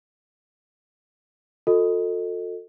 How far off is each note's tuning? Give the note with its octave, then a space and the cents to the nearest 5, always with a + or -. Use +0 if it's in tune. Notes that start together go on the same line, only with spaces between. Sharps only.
F#4 -45 A4 +20 D#5 +0